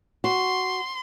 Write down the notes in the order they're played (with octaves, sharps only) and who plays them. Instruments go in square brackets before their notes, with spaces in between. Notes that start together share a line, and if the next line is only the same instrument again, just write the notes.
[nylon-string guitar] F#4 [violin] C6